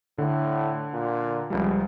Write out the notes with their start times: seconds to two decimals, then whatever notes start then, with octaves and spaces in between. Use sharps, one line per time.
0.18 A2 D3
0.93 A#2
1.50 F1 C#2 F3 G3